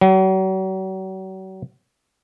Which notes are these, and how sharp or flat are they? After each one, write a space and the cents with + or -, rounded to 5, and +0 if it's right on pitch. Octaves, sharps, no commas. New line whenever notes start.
F#3 +40